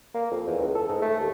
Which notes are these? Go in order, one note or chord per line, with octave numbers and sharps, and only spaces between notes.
A#3
F2
E2
C#2
A4
G#2
A3
D#2